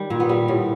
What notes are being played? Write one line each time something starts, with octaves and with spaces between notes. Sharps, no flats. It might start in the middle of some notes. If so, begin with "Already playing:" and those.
Already playing: D#3 G3
A#2
B3
G3
A2